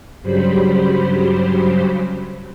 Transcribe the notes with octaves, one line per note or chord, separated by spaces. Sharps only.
G2 C#3 F#3 G3 C5 B5